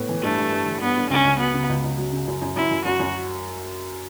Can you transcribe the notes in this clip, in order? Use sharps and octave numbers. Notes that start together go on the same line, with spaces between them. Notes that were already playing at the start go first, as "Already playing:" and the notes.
Already playing: A2 B3
E3
G2 A3
G2
G2
E3
G2 B3
G2
C#2 C#4
C#2
F#3 B3
C#3
C#2
C#2
F#3
C#3
F#2
F#2
F#2 E4
F#2
F#2 F#4
F#2